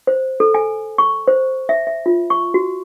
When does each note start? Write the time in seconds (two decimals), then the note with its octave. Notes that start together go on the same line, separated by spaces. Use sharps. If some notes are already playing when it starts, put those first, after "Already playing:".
0.07 C5
0.40 A4
0.54 G#5
0.98 C#6
1.28 C5
1.69 E5
1.87 E5
2.06 F4
2.30 C#6
2.54 F#4